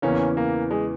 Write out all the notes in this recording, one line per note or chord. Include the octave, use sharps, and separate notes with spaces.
E2 C#3 E3 A#3 C#4
A#3
G#3